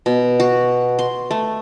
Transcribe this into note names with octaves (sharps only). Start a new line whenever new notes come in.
B2
F#4
C6
A3